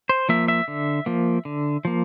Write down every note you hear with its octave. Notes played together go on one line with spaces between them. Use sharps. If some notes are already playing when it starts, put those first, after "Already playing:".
C5
F3 A#3 E5
E5
D3
F3 A#3
D3
F3 A#3